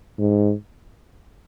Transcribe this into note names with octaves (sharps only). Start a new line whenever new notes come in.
G#2